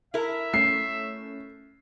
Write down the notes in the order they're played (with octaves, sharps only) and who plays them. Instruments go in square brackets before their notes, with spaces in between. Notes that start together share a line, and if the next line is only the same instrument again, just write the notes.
[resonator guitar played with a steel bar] E4 A#4 [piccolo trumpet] E5
[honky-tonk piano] A3 C#4 [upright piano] C7